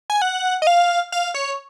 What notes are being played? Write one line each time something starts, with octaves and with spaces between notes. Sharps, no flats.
G#5
F#5
D#5
F5
F5
C#5